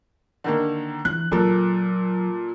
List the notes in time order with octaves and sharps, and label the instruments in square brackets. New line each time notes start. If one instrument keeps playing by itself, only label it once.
[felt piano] D3 D#3 A#3
[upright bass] E3 [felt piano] F#6
[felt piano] A#2 A4 A#4 [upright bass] F#3